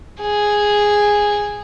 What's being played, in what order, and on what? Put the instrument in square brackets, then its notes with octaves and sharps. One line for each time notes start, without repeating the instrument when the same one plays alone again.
[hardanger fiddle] G#4